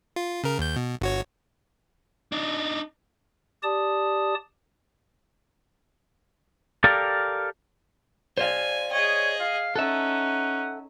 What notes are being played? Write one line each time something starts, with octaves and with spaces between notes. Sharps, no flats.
F4
C#3 A#4
D#2 G6
B2
G1 F#4 C#5
D4 D#4
G4 D5 A5 D#6
G4 A4 A#4 D5 F5
C5 D5 F5 G#5
G#4 C#5 D#5
F5
C#4 D#4 A4 E5 F#5